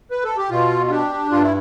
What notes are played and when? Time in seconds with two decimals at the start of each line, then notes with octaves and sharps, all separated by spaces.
0.11 B4
0.24 A4
0.37 G4
0.50 B2 F4
0.86 F4
0.90 D4 G4
1.31 G2 F4
1.42 E4